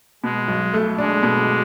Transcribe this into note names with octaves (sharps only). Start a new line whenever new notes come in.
B2 G#3
B1
A3
G#3 D4
B2